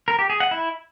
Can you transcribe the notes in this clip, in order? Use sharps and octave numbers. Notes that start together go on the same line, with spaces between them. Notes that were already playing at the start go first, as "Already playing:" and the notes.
A#4
G4
G#4
F#5
E4